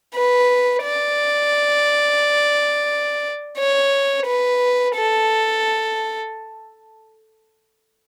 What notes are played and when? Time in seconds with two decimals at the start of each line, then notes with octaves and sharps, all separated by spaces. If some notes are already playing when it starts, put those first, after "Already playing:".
0.15 B4
0.83 D5
3.58 C#5
4.26 B4
4.96 A4